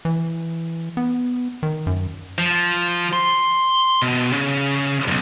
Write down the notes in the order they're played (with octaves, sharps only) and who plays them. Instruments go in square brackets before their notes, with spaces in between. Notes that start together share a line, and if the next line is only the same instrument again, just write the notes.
[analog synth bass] E3
B3
D#3
F#2
[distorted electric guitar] F3
C6
B2
C#3
B1 G2